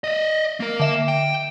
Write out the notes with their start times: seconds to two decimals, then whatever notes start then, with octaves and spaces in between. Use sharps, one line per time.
0.04 D5 D#5
0.60 A#3 A#4
0.80 D3 E5 E7
1.08 G5